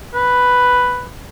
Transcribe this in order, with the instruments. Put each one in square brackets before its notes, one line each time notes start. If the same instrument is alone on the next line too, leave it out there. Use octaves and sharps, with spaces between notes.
[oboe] B4